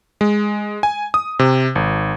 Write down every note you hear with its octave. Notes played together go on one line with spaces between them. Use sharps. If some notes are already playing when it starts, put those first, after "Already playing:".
G#3
G#5
D#6
C3
G#1